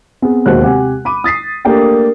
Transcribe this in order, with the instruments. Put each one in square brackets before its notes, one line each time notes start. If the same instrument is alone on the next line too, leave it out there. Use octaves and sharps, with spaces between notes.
[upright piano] B3 C4 G#4
E1 D#2 G#3 F#4 C5 F#6
C3 G4 F#5 G#5
B5 D6 D#7
D#6 A6 B6 C7
A3 A#3 D4 G4 A#4 G5